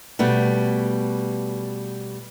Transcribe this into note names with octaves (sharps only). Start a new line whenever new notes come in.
B2 G3 A3 B3